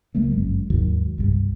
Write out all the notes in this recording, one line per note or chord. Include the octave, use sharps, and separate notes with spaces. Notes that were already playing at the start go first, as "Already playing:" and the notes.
C#2 F#3 G#3 A#3
G1 F#2
D#2 G#2 D#3 F#3
C2 G2